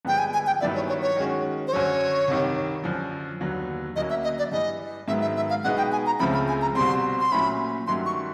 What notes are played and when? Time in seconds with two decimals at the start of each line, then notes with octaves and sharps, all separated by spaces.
0.05 G2 D3 F3 G#3 B3 G5
0.18 G#5
0.33 G#5
0.47 G5
0.61 G2 D#3 F#3 B3 E4 D5
0.75 C#5
0.88 C#5
1.02 C#5
1.16 D#3 G#3 C#4 F#4
1.67 C5
1.73 F#2 D3 F#3 C#5
2.28 C2 C3 D#3
2.84 F#2 D3 F3
3.40 D#2 D3 F#3 B3
3.96 D2 D3 F#3 A#3 C#4 D#5
4.10 E5
4.24 D#5
4.38 D5
4.51 G2 E3 G3 D#5
5.08 G#2 D#3 F#3 B3 E5
5.22 E5
5.36 E5
5.50 F5
5.63 B2 G#3 B3 D#4 F#5
5.77 G5
5.92 G#5
6.06 A#5
6.19 C#2 C#3 F3 A3 C4 B5
6.34 B5
6.48 G#5
6.62 A#5
6.75 C2 B2 G3 C4 C6
7.20 C6
7.32 A#2 F#3 A3 C#4 B5
7.87 G2 D#3 F#3 A3 C#4 C6
8.06 C#6